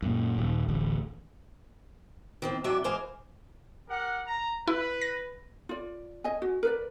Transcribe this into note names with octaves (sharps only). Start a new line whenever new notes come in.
F#2 A#2
D#1
D1 A1 D2
D#3 E3 C4
C3 E3 F#3 D4 D5 E5
E3 G#3 C5 D5 F5 G#5
G4 A#4 F#5
A#5
E4 B4
A#6
F4 D5
D#5 G#5
F#4
A#4 B4 D5